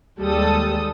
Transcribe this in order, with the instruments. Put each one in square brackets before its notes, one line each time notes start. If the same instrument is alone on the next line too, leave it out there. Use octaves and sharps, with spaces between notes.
[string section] D#2 G3 G#3 A4 D#6